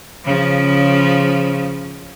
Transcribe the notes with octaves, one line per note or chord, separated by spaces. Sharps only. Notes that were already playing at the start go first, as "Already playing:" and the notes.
C#3 F3